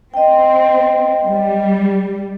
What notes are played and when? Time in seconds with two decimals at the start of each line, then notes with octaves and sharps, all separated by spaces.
0.14 C4 D#5 G5
1.24 G3